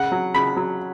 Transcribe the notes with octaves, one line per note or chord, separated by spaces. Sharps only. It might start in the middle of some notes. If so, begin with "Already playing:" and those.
Already playing: C#3 F#5
F#3
C#3 B5
F#3